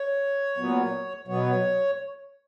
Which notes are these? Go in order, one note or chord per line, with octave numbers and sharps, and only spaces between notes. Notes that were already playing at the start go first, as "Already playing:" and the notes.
Already playing: C#5
A#2 F#3 B3
B2 F#3 B3 C#5